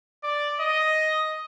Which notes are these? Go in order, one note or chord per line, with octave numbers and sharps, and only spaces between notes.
D5
D#5